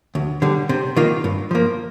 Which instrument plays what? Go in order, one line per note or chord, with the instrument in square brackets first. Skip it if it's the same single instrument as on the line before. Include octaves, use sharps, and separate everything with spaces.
[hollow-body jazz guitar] D2
D3 G3
C3
D#3 A#3 F4
G2
F3 A#3